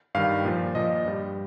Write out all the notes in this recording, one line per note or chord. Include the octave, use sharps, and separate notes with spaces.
G2 D#3 G3 F5
A#2 F3
A#2 F3 D#5
G2 G3